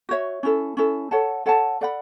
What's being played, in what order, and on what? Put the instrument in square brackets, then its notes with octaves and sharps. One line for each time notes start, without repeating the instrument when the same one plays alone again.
[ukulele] F#4 C#5 E5
C#4 E4 A4
C#4 E4 A4
A4 C#5 F#5 A5
A4 C#5 F#5 A5
A4 D5 F#5 B5